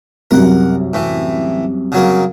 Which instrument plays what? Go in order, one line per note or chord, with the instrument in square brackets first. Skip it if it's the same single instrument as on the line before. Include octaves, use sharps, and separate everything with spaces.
[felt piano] C2 F#2 [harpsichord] A#4 F#5
[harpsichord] A2 E3
C#3 F#3 A#3